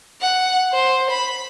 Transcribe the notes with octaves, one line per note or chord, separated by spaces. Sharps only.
F#5
C5
B5